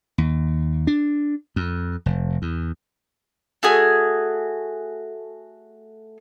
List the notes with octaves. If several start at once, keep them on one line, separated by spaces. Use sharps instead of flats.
D#2
D4
F2
F1
E2
A3 F#4 G#4 G#5